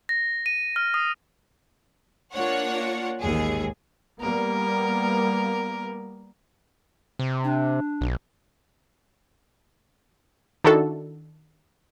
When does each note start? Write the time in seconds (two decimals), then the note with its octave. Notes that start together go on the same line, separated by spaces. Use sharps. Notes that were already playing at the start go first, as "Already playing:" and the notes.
0.09 A#6
0.46 D#7
0.76 F6
0.94 D#6
2.32 A#3 D4 F4 C#5 F#5
3.20 A1 D#2 G#2 G#4
4.21 G3 A#3 B3 A#4
7.19 C3
7.44 D4
8.01 B1
10.64 D#3 D4 E4 F#4 A4